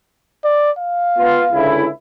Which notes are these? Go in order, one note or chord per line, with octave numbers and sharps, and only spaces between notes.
D5
F5
B3 F4
C#2 D3 E4